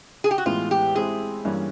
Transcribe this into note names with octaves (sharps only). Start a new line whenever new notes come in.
G#4
G4
F#4
A2 E3 G#3 B3 F4
G4
G#3 C4 E4 G#4
G2 E3 G3 A#3 C#4